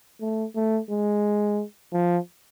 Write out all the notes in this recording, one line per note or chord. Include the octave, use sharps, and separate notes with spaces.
A3
A3
G#3
F3